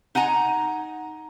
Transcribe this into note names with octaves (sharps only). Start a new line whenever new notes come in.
D#4 F#5 G#5 A#5